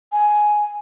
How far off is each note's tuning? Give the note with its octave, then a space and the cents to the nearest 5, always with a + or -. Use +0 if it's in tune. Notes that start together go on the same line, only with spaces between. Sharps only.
G#5 +10